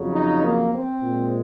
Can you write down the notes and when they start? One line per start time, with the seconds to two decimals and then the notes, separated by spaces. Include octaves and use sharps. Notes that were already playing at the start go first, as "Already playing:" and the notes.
Already playing: F2 C#3 F#3
0.11 D#4
0.42 A#3
0.73 C4
1.03 A#2 G#3